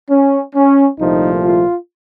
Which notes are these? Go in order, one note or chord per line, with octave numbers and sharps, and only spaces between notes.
C#4
C#4
C2 A#2 F3 A3 D#4
F4